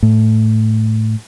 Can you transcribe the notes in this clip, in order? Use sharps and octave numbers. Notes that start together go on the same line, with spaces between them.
A2